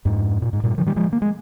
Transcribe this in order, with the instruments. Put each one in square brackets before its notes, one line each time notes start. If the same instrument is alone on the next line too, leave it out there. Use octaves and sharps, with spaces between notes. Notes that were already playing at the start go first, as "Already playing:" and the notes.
[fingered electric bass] F2 G#2
A#2
G#2
G2 A#2
D3 F3
D#3 G3
F3 G#3
A#3
G#3